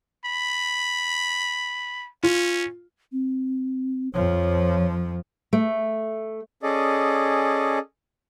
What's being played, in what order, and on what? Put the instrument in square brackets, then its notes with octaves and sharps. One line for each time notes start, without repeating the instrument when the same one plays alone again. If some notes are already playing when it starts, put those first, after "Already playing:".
[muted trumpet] B5
[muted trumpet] C#4 [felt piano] F4
[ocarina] C4
[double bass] F2 F3 [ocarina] C#5
[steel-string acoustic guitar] A3
[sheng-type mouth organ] C#4 G#4 A4 D5 D#5